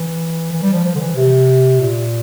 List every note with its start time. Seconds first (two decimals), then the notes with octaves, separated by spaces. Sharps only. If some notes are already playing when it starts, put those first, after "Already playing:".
Already playing: E3
0.52 E3
0.63 G3
0.73 F3
0.84 F3
0.95 D3
0.99 E3
1.16 C3
1.80 A#2